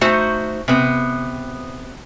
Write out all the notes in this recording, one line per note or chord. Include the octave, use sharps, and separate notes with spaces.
A3 D#4 F#4 C5
C3 B3